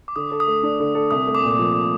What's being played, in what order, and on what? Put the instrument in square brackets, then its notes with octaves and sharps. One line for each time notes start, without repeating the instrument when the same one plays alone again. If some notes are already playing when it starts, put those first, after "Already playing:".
[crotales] D6
[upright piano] D3 [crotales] D#6
[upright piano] A4
[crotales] D#6
[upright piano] A3
D4
D3
A4
[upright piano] C2 [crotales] D#6
[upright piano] A3
[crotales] D6
[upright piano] A#2
[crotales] D6
[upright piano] F3